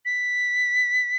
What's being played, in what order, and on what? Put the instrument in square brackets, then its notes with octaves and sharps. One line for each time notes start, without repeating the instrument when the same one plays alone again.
[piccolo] B6